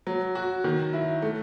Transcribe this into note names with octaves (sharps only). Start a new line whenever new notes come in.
F#3
F#4
D#3
E4
A3